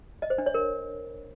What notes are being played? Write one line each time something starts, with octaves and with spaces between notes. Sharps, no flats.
D#5
C5
D4
C#5
A#4